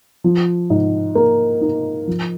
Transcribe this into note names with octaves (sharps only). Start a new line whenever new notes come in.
F3
G#2
A#3
D#4
F3